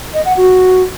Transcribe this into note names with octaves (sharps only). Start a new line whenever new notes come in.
D#5
F#5
F#4